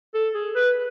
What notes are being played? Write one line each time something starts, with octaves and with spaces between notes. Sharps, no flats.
A4
G#4
B4